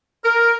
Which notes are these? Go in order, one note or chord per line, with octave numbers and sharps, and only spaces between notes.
A#4